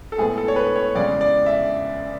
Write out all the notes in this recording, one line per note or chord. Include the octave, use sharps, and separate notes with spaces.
A4
A2 G#3 B3 G#4
A4
C#5
B4
C#5
E2 C#3 G#3 D5
D5
E5